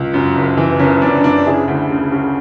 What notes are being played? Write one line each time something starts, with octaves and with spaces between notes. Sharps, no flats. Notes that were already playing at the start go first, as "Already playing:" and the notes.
Already playing: C#2
F#2
F#1
E3
F#1 C#4
F#1 D4
C#4
F#1 D4
C#3 E4 G#4
D2
C#3
C#3